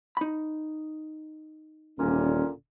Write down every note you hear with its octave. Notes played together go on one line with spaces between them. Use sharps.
D#4 B5
D#1 A#2 D3 C#4